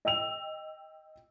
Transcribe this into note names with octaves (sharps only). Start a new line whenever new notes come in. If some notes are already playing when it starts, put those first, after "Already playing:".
D#5 G5 E6 F7